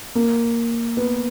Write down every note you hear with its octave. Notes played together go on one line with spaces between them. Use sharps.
A#3
B3